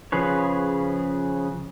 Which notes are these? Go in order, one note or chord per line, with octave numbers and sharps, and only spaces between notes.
C#3 F3 G#4 B4 C#5